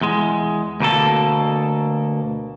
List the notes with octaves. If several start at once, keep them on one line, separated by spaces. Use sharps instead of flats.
E2 G#3
D2 B2 A#3 A4